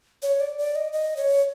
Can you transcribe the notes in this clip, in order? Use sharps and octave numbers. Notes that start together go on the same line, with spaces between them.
C#5
D5
D5
D#5
D#5
C#5